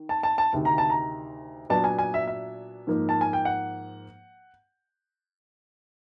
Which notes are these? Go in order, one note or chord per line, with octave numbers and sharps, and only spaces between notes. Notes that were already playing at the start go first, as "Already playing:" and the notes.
Already playing: D#3
A5
A5
A5
D2 C3 D#3
A#5
A5
A#5
A#2 F#3 B3 D4 A5
G#5
G#5
E5
E5
G#2 F3 A#3 D#4
A5
G#5
G5
F#5